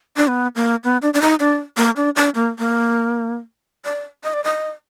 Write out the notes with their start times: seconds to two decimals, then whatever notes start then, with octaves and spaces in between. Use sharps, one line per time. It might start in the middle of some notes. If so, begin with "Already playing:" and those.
0.17 D4
0.28 B3
0.56 A#3
0.84 B3
1.02 D4
1.14 D4
1.22 D#4
1.40 D4
1.77 A#3
1.96 D4
2.16 D4
2.35 A#3
2.59 A#3
3.85 D5
4.24 D#5
4.33 D5
4.44 D#5